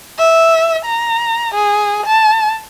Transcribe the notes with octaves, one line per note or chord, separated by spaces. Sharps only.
E5
A#5
G#4
A5